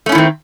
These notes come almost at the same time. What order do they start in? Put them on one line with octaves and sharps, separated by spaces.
A3 C#4 E4 D#3 C4